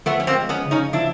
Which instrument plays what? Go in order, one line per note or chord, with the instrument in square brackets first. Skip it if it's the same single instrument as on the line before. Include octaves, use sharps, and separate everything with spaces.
[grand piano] F3 [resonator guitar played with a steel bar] A3 B3
[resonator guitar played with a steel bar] C#4
A#3 C4
[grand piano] G#3
[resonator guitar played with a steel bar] B3 C#4
[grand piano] C#3
[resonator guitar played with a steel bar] C#4 D#4
[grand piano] F3 [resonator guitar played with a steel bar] D4 E4